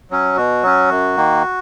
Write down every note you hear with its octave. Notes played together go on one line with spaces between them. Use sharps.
F#3 C#4
B2 F#4
F#3 C#4
F#2
D#3 A#3